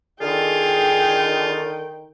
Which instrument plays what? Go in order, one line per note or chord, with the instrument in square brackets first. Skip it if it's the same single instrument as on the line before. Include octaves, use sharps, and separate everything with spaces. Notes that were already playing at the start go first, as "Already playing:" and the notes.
[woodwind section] D3 D#3 [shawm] F4 [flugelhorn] G#4 [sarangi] G5